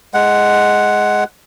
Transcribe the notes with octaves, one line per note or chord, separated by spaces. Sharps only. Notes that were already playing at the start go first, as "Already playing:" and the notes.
G#3 F#5